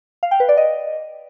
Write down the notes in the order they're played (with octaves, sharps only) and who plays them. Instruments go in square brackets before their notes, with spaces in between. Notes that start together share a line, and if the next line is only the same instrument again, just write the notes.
[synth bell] F5
G5
B4
D5
D#5